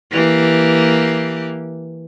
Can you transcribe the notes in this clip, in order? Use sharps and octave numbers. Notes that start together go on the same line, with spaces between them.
E3 A#3 G4